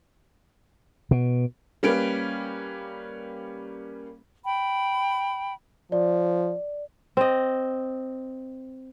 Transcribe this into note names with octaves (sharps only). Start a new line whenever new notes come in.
B2
G3 A#3 C#4 B4 D7
G5 B5
F3 D5
C4 D#5